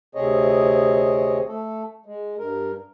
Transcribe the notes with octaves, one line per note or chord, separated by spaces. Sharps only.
D2 C3 C4 G#4 C#5 D#5
A3 A4
G#3
G2 A#4